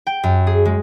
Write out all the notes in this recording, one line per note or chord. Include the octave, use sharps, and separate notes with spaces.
G5
F#2
G#4
G#3